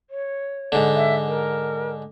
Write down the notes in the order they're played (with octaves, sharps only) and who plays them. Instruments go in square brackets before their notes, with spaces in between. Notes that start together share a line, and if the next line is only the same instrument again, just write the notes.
[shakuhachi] C#5
[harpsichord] G#2 D3
[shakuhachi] E5
A#4